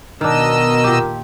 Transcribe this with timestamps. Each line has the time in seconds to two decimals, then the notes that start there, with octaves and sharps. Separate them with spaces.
0.21 B2 D#3 D4 A#4 D#5 E6
0.84 A#2 G4